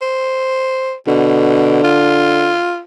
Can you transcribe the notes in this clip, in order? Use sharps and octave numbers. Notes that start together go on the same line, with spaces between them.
C5
B2 D3
F4